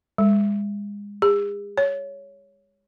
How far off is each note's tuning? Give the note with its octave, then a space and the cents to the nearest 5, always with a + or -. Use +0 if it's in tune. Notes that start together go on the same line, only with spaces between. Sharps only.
G#3 -30
G#4 -45
C#5 +10